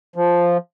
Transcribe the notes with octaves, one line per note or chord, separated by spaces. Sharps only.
F3